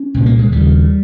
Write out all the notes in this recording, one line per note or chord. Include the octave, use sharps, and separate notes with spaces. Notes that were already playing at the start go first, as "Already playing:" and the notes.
Already playing: C#4
C2 A#2
A#3
G#3
D#2 C#3 G3